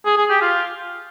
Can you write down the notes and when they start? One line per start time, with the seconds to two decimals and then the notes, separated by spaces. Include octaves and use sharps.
0.06 G#4
0.18 G#4
0.30 G4
0.42 F4